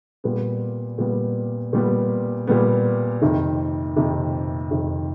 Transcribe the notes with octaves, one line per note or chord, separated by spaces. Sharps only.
A#2 G3 B3
A#2 G3 B3
A#2 G3 B3
A#2 G3 B3
F2 C3 D#3
F2 C3 D#3
F2 C3 D#3